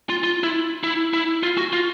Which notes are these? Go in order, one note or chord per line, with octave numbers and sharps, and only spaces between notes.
F4
F4
E4
E4
E4
F4
F#4
F4